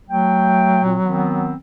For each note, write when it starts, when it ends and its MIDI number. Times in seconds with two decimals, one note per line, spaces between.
0.08 1.54 54
0.08 0.81 57
0.08 0.81 79
0.83 0.96 46
0.83 0.96 60
1.04 1.54 51
1.04 1.54 59
1.04 1.54 60